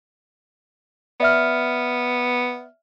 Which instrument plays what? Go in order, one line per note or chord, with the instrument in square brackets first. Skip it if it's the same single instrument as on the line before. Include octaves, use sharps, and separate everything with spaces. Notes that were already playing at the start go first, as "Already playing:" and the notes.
[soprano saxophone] B3 [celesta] D5 E5 F6